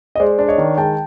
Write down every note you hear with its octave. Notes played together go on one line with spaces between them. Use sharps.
D#5
G#3 C5 D5
D4
C#5 D#5
D#3
G#3 G5 A5